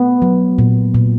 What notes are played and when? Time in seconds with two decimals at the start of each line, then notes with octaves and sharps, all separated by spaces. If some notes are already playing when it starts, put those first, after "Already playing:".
Already playing: A3 B3
0.22 F#3
0.58 A#2
0.94 A#2